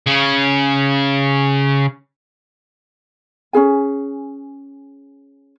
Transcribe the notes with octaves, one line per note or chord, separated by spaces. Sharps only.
C#3 C#4
C#4 D#4 G#4 G#5